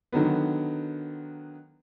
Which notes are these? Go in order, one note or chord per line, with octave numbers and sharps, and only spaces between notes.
D3 D#3 F#3 B3